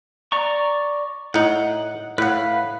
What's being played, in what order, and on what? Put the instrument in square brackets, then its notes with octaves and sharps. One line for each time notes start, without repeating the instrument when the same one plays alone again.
[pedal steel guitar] D5 A#5 C#6
[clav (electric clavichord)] A2 D#4 [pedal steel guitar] F#5
[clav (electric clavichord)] A2 F#5 [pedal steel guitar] B4 F5